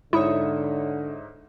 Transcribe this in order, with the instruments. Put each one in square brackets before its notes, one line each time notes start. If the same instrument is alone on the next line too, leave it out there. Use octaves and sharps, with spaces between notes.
[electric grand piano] G#2 D#4 D#6 [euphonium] D3 [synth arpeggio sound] E4 [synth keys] C#5 E5